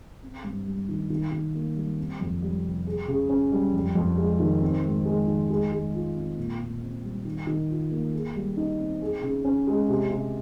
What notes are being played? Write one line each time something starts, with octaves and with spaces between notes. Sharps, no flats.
C4
G2
G3
D#3
D#3
D#3
A#3
G3
C4
F2
G3
C3
G#4
C#3
C#4
G3
F2
F2
G#3
D#3
C4
G#2
G#3
D#3
G#3
G#3
F4
C4
A#2
A#2
C4
G3
D#3
D#3
F4
A#3
G#4
G3
D#4
C4
G#4
C#3
C#4
G#3
C3
C3